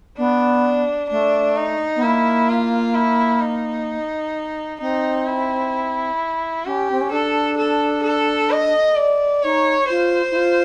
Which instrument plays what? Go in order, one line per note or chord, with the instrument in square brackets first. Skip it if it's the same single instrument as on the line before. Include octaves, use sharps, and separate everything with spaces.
[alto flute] B3 [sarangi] D4
[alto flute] A3 [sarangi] D4
[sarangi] D#4
[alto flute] B3
[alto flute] A#3 [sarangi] E4
[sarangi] F4
E4
D#4
[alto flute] C4 [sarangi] D#4
[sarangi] E4
[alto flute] C#4 [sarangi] G4
[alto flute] C4
C#4
[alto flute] D4 [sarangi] A4
[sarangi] A4
A4
D#5
D5
[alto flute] D#4 [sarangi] C#5
[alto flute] F4 [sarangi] C5
[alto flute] E4
F4